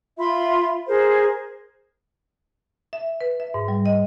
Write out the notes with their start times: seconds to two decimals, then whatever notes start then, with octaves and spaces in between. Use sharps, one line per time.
0.18 F4 E5 B5 C6
0.87 G#4 A#4 C5
2.93 E5
3.21 B4
3.40 E5
3.54 G#2
3.68 G3
3.86 D#5